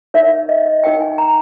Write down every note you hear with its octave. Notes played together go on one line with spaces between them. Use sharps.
D#4 A#4 C#5 E5
D#5
D#5
D#4 A#4 C#5 G5
G#5
A#5